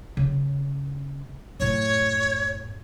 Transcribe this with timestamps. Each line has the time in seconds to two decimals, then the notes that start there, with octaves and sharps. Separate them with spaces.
0.17 C#3 C#4
1.60 F#2 A2 C#5